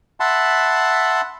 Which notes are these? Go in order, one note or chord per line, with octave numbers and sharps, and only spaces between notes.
E5 F#5 A5 B5 C6